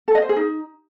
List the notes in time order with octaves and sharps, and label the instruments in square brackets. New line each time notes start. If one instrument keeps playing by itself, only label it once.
[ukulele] A4
D#5
C5
G#4
D#4